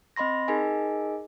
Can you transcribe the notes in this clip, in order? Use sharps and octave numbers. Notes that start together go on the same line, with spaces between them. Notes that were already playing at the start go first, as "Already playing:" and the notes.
C4 D#5 B5 C6 A#6
D#4 G#4 A#4 D#5 G#5